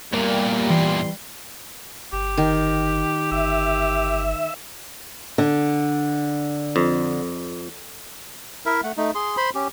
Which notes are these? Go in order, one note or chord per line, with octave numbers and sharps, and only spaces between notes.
E2 A#2 G3 A#3
E3 C6
G1 G4
D#3
G1 G4 E5
D3
F2
E4 A#4 E5
A3 F#5
A3 D#4
G#4 C6
C5 B5 C6
C#4 G4